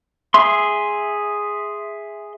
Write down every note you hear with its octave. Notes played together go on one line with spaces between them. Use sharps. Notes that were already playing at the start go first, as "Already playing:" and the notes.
G#4 E5 C6